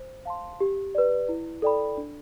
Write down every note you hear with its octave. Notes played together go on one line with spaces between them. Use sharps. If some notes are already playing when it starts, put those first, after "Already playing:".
Already playing: C5
F5 A5 C6
G4
B4 D5
E4
A4 D5 G5 B5
D4